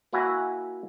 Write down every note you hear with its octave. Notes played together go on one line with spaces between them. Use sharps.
A#3 E4 F#4 E5 G#5 A#5